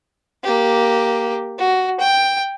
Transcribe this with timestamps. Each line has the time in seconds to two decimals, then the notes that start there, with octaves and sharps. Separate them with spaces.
0.43 A#3 G4
1.58 F#4
2.00 G5